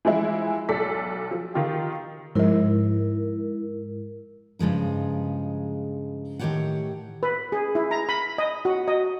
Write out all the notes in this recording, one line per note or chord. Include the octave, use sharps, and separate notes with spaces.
E3 F3 G#3 E4
B1 A4 D5 B6
F3
D#3 F4 G4
G#2 F3 G#3 E4 A#4
G2 C#3 F3 G#3 D#4
A2 D#3 F#3 G4 C#5 F#5
B4
G#4
E4
A#5
B5
D#5
F#4
D#5